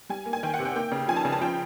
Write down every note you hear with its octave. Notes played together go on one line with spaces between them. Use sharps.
G3 G#5
A#3
G#5
D#3 G5
F#5
C3
G5
A#3 G5
C#3
F3 G#5
A5
C#3
A5
F3 G5